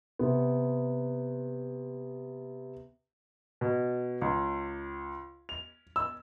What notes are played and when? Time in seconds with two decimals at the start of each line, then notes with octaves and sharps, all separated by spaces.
0.19 C3 B3
3.61 B2
4.21 C#2
5.49 F7
5.96 E6